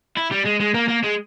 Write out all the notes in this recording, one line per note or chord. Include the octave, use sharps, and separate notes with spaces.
E4
G3
G#3
G#3
A#3
A#3
G#3